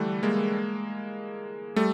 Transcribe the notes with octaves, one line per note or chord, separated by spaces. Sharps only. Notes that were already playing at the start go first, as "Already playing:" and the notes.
Already playing: D3 E3 G3 A3
G#3 A#3
G3 A3